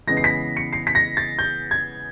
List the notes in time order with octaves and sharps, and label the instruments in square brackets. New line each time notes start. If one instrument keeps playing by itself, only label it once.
[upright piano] C#3 E3 G#3 B3 A#6
C7
B6
C#7
C7
B6
A#6
A6
G6
G#6